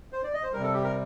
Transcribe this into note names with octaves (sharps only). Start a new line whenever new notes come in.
C5
D5
D#5
C5
C3 G3 A#4
A4
G4
A#4